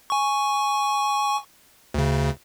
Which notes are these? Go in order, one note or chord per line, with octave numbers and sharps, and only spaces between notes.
G#5 C#6
D2 C#3